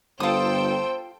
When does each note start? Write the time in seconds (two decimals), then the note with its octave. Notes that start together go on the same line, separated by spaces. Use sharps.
0.20 G1 F4 A4 C5 G5 D#6 E6